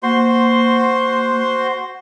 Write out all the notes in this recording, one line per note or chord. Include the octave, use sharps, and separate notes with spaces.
A#3 F#4 C5 C6